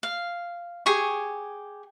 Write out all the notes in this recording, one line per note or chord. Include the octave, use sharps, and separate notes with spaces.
F5
G4 G#4 G#5 C#6